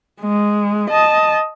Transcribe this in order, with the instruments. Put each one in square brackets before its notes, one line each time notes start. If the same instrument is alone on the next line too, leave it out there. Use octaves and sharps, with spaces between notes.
[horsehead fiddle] G#3
D#5 A5